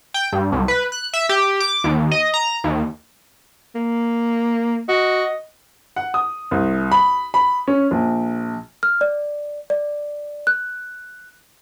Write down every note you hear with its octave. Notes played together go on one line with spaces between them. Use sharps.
G5
G2
C2
B4
F#6
E5
G4
D6
D#2
D#5
A#5
D#2
A#3
F#4 D#5
F#5
D#6
C2
B5
B5
C#4
A#1
F6
D5
D5
F#6